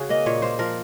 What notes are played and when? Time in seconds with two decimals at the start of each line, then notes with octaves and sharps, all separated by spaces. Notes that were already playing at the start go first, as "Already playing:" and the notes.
Already playing: C#3 F#4 G#4
0.09 A#3 D#5
0.26 A#2 C#5
0.42 A#3 C5
0.59 F3 A#4